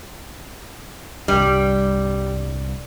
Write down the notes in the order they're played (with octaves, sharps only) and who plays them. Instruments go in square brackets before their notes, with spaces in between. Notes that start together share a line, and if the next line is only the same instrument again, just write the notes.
[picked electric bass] C2 G2 [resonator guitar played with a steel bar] G3